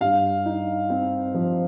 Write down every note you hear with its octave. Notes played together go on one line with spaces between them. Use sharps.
G2 F5
D#4
C4
F3